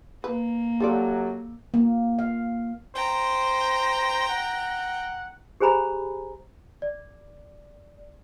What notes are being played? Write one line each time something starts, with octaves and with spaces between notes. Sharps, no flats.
A#3 B4
F#2 F3 F#3 F4 G4 A4 D5
A#3
F5
C5 G5 A#5
F#5
G4 G#4 C5 G#5 A#5 B5
D5